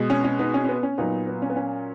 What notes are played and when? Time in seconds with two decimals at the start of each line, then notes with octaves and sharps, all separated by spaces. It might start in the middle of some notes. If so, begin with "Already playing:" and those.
Already playing: B2 G#3
0.10 C#4
0.24 C#4
0.39 B3 D#4
0.54 C#4
0.64 C#4
0.69 B3
0.83 C#4
0.98 A#2 F#3 B3 D#4
1.27 B3
1.42 C#4
1.50 B3
1.56 C#4